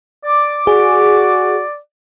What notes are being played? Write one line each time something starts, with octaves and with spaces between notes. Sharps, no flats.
D5 D6
F#4 G#4 D5